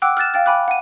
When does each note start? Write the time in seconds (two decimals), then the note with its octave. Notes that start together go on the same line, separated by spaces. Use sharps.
0.02 F#5 G5 D6 E6 F#6
0.17 F6 F#6 A6 E7
0.34 F5 G5 A6
0.46 G5 G#5 B5 D6 F#6
0.68 F#5 D#7